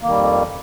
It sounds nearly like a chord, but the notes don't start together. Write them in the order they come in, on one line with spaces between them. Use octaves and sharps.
A#3 D#3 G3 F2